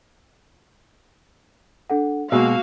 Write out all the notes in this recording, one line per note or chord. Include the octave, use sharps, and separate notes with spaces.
D4 A4 F#5
B2 G#3 A#3 F#4 F5 E6